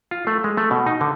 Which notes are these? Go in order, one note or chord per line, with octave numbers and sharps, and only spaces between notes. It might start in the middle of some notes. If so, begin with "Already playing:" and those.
F4
A3
G#3
A3
B2
D#4
D3